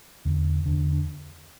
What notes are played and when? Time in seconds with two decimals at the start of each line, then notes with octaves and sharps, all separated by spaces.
0.25 E2 D3
0.66 E2 D3 D4
0.93 D4